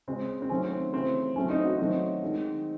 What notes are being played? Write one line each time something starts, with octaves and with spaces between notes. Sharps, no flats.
C#3 G#3 C4
C4
D#3 F#3 A3 C#4
C4
C#3 E3 A3 C4
A2 F#3 A3 C#4
C4 D#4
D#4 F#4
D#3 F#3 A3 C4 D#4
D#3 G#3